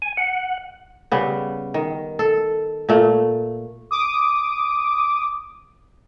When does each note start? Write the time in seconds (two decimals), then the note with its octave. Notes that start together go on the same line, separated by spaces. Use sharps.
0.02 G#5
0.17 F#5
1.12 C#3 G3 B3
1.74 D#3
2.19 A4
2.89 A#2 A3
3.91 D6 D#6